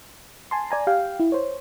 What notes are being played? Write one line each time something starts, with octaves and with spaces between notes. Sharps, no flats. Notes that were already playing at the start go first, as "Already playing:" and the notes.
G#5 A5 C6
D5 G#5 A#5
G4 F5 G5
E4
C5 C#5